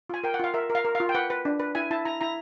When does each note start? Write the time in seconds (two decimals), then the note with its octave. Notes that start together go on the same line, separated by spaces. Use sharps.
0.10 F4 G#5
0.24 A#4 G5
0.34 F#5
0.40 F4 F5
0.54 A#4 E5
0.70 A#4
0.75 F5
0.85 A#4
0.95 F5
1.00 F4
1.09 G5
1.15 B4 F#5
1.30 B4
1.45 D4
1.60 B4
1.75 E4 G#5
1.91 E4 A5
2.05 E4 A#5
2.21 E4 A#5